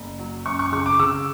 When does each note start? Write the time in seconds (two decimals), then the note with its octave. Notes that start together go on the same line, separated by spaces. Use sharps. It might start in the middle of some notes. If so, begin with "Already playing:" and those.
Already playing: F#1
0.19 F#3
0.45 F#2 C#6
0.59 C#6
0.72 C#3 C#6
0.86 D6
0.99 C#3 E6